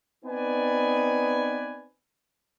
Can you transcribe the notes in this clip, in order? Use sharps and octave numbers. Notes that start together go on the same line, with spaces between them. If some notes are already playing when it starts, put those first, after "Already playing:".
B3 C4 D#4 B4 D5 G#5